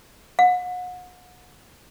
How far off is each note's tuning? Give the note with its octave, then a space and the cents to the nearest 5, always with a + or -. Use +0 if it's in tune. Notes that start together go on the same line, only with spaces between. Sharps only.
F#5 -35